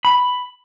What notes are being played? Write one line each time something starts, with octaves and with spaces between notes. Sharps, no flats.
B5